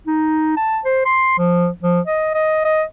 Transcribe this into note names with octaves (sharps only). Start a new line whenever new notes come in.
D#4
A5
C5
C6
F3
F3
D#5
D#5
D#5